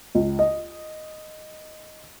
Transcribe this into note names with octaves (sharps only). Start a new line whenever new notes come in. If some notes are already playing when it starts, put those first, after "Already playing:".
C#2
D#5